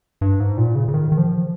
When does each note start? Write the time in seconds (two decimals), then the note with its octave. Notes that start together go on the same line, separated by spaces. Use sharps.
0.21 G2
0.40 G#2
0.57 A#2
0.75 C#3
0.88 C#3
0.94 D#3
1.12 D#3
1.18 F3